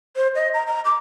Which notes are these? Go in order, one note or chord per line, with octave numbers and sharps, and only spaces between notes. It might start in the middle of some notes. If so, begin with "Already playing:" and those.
C5
D#5
A#5
A#5
D6